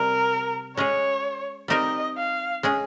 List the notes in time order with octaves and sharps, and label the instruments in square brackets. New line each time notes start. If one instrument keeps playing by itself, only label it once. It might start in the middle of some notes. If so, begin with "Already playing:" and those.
Already playing: [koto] C3 G3 C4 [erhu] A#4
[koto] G#3 C#4 G#4 [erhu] C#5
[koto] G3 C4 D#4 G4 A#4 [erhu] D#5
[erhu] F5
[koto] G#3 C#4 G#4